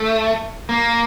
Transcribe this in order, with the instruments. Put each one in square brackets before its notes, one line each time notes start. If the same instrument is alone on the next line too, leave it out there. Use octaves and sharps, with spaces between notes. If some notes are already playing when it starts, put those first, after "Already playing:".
Already playing: [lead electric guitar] A3
A#3